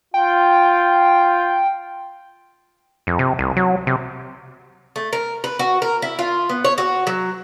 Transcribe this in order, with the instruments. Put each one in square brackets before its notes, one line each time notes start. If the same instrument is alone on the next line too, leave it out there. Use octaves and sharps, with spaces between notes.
[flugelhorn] F4 [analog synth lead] G5
[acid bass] F2
C3
C2
F#3
C3
[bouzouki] A3
A#4
B4
F#4
A#4
E4
F4
B3
C#5
F#4
F#3